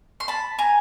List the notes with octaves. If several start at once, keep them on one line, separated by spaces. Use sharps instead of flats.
C6
A5 B5
G#5 A#5